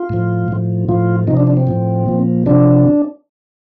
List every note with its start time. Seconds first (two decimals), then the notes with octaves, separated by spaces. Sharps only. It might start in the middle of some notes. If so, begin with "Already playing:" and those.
Already playing: F4
0.09 A2 F3
0.48 A2 F3
0.89 A2 F3 F4
1.27 C3 F3 D#4
1.37 D4
1.47 D4
1.57 C4
1.67 A2 F3
2.06 A#2 F3
2.46 C3 F3 D4